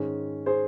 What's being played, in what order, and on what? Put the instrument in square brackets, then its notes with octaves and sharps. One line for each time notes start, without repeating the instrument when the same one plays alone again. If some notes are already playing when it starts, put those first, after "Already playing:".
Already playing: [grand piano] G#2 D#3 G#3 C#4
[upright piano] G#4 C5